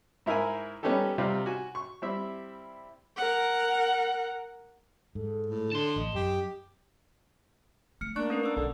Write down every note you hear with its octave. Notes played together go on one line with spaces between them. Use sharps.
G#2 E4 A#4 E5 G#5
G3 B3 C#4 D#4 G4 A4
C3 G3 C4 D#4 F4
F#4 G#5
C#6
G3 C4 E4 E5
A#4 F#5
G#2 A4
A2
D3 A5 C6
A1 D#5
F#2 G4
A3 F6 C#7
A#3 D4 C#6 F#6
C#4 A#4 B4
D4 B4 E6
B1 D3